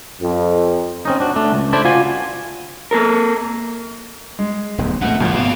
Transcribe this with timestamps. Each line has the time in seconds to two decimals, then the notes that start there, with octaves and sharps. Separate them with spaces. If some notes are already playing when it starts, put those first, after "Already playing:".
0.21 F2
1.05 C4 C#4 D#4
1.20 D4 F#4
1.36 A3 D4
1.52 C#2
1.73 D4 E4 A4 C5 D5
1.85 F4 F#4 G#5
2.91 A#3 A4 A#4
4.39 G#3
4.78 D1 B1 E2
5.02 F2 B2 A3 F#5
5.21 G#1 G2 C3 E3 F3 A#3
5.34 B2 G#4 F5